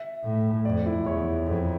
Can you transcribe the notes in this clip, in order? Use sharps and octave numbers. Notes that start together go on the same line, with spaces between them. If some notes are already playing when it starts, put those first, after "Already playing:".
Already playing: E5
A2
F2 D5
E4
E2 C#5
F2